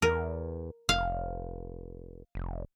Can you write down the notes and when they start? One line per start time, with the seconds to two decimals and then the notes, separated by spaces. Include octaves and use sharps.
0.02 E2 A#4
0.89 F1 F5
2.35 F1